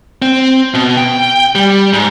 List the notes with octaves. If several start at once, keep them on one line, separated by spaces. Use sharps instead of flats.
C4
B2
G5
G3
G#2